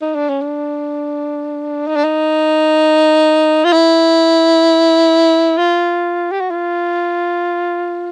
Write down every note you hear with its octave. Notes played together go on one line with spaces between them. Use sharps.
D#4
D4
C#4
D4
D#4
D4
D#4
F4
E4
F4
G4
F#4
F4